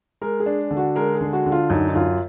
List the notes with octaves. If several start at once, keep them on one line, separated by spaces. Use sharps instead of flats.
G#3 A#4
G#4
D4
D3
F#4
G#3 A#4
G#4
D3
F#4
D3
F4
F#2 D#4
D#4
F#2 F4